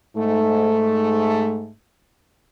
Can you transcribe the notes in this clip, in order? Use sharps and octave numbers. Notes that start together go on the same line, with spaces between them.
G#2 A3